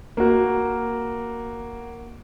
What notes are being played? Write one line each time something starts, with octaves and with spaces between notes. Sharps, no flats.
A#3 F#4